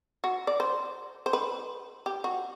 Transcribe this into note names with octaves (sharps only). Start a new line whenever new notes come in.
F#4
D5
C5
C5
B4
G4
F#4